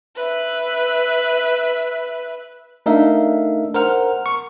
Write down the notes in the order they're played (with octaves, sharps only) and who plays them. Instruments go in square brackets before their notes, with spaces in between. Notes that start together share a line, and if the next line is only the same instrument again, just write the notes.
[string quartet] B4 E5
[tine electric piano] A3 D4 D#4 A#4 E5 F5
A#4 C5 F#5 F6
C#6